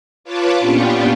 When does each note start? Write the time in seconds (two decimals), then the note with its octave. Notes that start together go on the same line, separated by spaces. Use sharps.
0.24 F4 B4 C#5 A5 D6
0.59 A#2 B3 C#4 D4 F4 G4